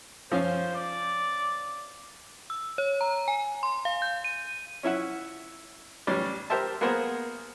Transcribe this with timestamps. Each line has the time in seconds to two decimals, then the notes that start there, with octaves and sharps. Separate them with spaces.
0.32 F3 C#4 C5 F5
0.75 D5
2.50 E6
2.78 C#5
3.01 A#5
3.28 G#5
3.63 C6
3.85 F5
4.02 G6
4.24 D#7
4.83 C#4 E4 E5 F#5
6.07 A1 G3 C#4 D5
6.50 G4 A#4 C5 E5 A5
6.81 A#3 B3 G#4 A#4 C5 F#5